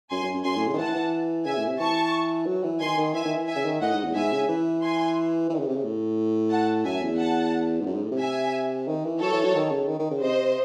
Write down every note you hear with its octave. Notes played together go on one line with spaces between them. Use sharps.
F#2 G#5 C6
F#2
F#2
F#2 G#5 C6
A2
C#3
D#3
E3 F#5 A5
E3
C#3 E5 G#5
A2
C3
E3 A5 C#6
F#3
E3
D#3 G#5 C6
D#3
E3 E5 G#5
D#3
E3
E5 G#5
C#3
D#3
A2 D#5 F#5
G#2
E2
G#2 E5 G#5
C#3
E3
G#5 C6
E3
D#3
C#3
C3
C#3
A2
F#5 A5
F#2 E5 G#5
E2
F#5 A5
G#2
F#2
G#2
A2
C3
E5 G#5
D#3
E3
F#3 A4 C#5
E3
F#3
D#3
C#3
D#3
D#3
C#3
C3 C5 D#5